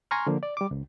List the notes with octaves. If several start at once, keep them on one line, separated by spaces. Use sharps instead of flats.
G#5 A#5 C6 C#6 F6
D3 F3 A#3
D5
G3 D6
C#2